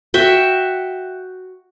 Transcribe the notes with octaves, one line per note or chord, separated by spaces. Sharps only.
F#4 E5 G5